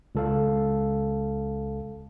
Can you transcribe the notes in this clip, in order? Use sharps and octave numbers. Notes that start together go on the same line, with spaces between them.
C#2 A4 F5